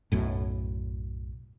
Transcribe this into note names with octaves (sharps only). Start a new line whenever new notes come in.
B1 F#2 A2